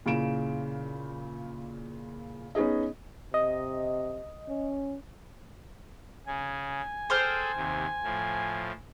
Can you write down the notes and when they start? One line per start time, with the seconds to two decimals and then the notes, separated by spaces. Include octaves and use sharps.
0.06 A#2 C#3 E4 D7 E7
2.55 B3 C#4 D#4 G#4 D#5
3.34 C3 D#5
4.49 C#4
6.27 C#3 G#5
7.10 G#4 A4 C5 G5 F6
7.57 D#2 C3
8.03 A2 F3